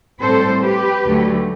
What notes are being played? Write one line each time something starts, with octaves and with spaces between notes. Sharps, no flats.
A2 G3 C4 A4 C5
G4 B4
D2 D3 F#3 A3